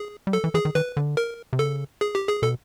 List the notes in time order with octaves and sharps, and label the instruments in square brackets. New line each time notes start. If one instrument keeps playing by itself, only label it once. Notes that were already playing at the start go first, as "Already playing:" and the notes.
Already playing: [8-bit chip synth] G#4
[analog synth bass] G3
[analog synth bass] F#3 [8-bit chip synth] A4
[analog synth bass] E3
[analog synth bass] E3 [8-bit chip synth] G#4
[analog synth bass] D#3
[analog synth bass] D#3 [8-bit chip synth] B4
[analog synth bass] D3
[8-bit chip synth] A#4
[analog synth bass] C3
[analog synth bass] C#3 [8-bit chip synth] A4
[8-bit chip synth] G#4
G4
G#4
[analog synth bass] B2 [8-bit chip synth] A4